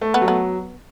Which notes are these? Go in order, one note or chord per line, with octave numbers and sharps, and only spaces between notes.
A3
B3
F#3
B3